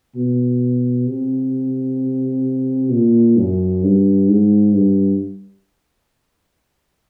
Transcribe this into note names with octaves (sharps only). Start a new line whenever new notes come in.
B2
C3
A#2
F#2
G2
G#2
G2